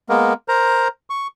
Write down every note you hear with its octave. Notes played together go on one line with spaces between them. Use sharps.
G#3 A#3 B3 A#4
A#4 C5 A#5
C#6